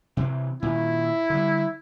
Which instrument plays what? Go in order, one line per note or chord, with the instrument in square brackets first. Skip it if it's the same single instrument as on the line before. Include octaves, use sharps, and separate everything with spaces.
[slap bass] C3 E3 C4
[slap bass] A#2 D#3 [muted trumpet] E4
[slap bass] D3 G3